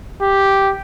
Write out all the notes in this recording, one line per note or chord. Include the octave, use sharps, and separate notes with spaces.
G4